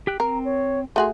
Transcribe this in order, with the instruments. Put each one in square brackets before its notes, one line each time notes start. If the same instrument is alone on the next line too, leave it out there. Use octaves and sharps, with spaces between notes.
[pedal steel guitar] G4 G5 F#6
[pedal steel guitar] C4 [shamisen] A#4 [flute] A#5
[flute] C#5
[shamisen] A3 F#4 G#4 [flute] C6